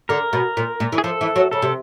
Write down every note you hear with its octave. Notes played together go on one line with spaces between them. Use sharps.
D3 A#4
B2
A#2
A#2
E3
G#4
F3 A4
E3
F#3
C#3 A4
C3